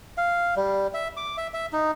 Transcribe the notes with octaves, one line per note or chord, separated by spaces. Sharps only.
F5
G3
E5
D6
E5
E5
D#4